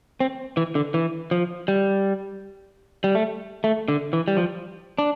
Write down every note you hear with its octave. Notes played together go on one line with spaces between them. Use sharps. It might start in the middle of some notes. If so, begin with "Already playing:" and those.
C4
E3
D3
E3
F3
G3
G3
A3
A3
D3
E3
G3
F3
D4